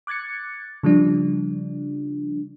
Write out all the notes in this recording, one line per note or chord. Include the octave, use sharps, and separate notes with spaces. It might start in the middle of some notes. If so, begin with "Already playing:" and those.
D6 F#6 G#6 A6 C#7
C#3 F3 G3 D4